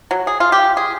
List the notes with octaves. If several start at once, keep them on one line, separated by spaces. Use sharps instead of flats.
F#3
G#4
F4
G4
G#4